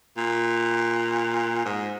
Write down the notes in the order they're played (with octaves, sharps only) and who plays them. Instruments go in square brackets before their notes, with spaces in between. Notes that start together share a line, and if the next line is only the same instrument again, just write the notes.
[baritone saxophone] A#2
G#2